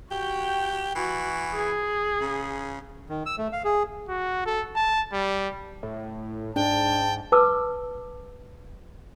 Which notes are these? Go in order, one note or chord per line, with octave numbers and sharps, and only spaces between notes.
F#4 G4 G5
E3 F#4
G#4
C#3
D#3
E6
A3
F5
G#4
F#4
A4
A5
G3
A2
G#2 D4 G5 A5
B4 A5 D6 E6